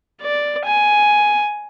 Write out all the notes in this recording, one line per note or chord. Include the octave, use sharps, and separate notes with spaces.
D5
G#5